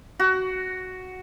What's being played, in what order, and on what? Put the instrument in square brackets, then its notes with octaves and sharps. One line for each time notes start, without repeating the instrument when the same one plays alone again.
[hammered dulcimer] F#4